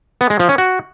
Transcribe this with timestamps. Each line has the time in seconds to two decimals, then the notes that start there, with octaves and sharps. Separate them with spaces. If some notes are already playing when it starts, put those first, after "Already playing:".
0.21 B3
0.30 G#3
0.39 F3
0.49 C#4
0.58 F#4